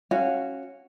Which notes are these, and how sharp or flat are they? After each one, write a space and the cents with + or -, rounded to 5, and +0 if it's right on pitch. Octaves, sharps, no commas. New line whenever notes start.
C#4 -15 F#4 +0 F5 -15